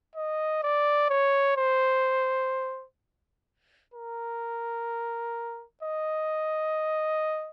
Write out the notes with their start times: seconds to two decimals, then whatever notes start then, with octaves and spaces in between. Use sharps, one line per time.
0.16 D#5
0.63 D5
1.10 C#5
1.57 C5
3.94 A#4
5.83 D#5